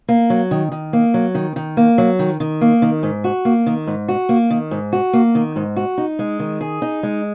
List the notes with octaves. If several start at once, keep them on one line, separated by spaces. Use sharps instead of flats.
A#3
F#3
D#3
D#3
A#3
F#3
D#3
D#3
A#3
F#3
D#3
D#3
A#3
D#3
G#2
F#4
A#3
D#3
G#2
F#4
A#3
D#3
G#2
F#4
A#3
D#3
G#2
F#4
D#4
G#3
D#3
G#4
D#4
G#3